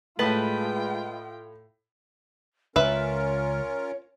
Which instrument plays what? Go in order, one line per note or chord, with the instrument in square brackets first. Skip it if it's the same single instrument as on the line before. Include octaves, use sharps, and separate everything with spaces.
[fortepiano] A2 [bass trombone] G#3 [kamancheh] F4 G5 [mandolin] B4 D#5 A5
[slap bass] C#2 [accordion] C#4 F4 A#4 [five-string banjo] B4 E5 [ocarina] C#5